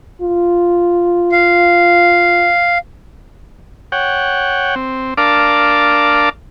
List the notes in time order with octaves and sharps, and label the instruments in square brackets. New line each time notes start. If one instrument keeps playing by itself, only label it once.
[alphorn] F4
[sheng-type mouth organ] F5
[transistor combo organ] C#5 F#5 G5
C4
D4 A#4 D5 F5 A5 D6